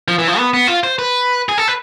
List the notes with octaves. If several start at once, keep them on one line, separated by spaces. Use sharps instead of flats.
F3
E3
F3
B3
B3
F4
C5
B4
G#4
A4
B4